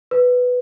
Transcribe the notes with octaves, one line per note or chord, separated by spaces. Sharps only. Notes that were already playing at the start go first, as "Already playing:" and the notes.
B4